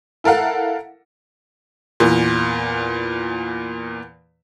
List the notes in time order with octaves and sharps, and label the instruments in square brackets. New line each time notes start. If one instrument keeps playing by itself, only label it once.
[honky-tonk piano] E4 A4 A#4 F5 F#5
E2 A#2